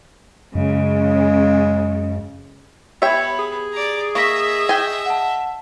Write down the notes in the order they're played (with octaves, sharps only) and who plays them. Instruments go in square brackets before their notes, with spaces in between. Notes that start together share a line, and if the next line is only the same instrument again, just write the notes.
[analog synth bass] F#2 [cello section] C#3 [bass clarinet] G#3
[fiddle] B3 B5 [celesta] G4 G#6 [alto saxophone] C#5 [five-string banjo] E5 G5
[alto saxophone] G#4
[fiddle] D5 A#5
[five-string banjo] A#3 [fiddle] D#5 E5 [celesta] C#6 A#6 B6
[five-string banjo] G5 G#5
[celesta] F#5 A5